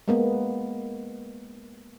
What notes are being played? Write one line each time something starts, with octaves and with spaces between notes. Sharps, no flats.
G#3 A#3 B3